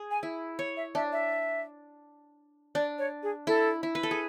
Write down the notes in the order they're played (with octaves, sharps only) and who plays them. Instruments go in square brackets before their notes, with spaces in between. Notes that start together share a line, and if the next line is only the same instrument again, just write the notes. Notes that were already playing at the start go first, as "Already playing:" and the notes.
Already playing: [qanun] G#4
[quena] G#5
[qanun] E4
C#5
[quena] E5
[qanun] D4 [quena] E5
[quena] E5
[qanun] D4 [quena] D5
[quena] C#5
G#4
[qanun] E4 [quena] A4
[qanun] E4
B4
A4
G#4